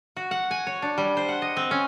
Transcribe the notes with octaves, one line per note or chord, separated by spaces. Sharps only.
F#4
F#5
G#5
C#5
D4
G3
C5
F#5
D#5
C4
C#4